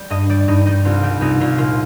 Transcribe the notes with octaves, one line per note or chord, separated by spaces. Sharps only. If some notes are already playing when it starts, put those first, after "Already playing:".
Already playing: G3
G2 D#5
G3 D5
G2 D#4
G3 D#4
C2 F4
G3 G4
C2 D#4
C2 F4
A#2 F4